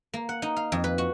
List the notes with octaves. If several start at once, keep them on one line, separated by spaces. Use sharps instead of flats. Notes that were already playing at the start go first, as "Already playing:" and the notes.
A#3
F#5
D#4
F5
F2
B4
F#4